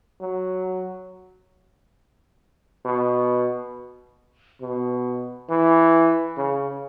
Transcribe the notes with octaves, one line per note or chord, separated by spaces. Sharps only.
F#3
B2
B2
E3
C#3